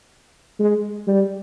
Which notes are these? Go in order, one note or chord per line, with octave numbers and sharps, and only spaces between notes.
G#3
G3